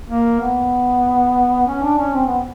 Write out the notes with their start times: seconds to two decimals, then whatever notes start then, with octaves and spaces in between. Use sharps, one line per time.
0.09 A#3
0.40 B3
1.67 C#4
1.83 D4
1.98 C#4
2.14 C4
2.27 B3